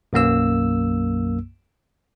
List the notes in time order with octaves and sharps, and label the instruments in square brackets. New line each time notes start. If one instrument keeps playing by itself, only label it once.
[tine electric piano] B1 F#2 A#3 E6